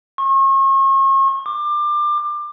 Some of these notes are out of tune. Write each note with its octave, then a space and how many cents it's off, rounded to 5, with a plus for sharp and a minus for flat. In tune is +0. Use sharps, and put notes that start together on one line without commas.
C#6 -40
D6 +25